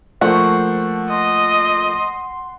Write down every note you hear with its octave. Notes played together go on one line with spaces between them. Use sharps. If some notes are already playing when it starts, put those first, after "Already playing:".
F3 A3 A#3 C5 F#5 C#6
D#5 C6